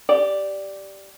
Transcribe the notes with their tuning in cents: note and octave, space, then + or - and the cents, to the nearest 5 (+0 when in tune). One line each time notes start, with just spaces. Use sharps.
G4 -5 D5 +0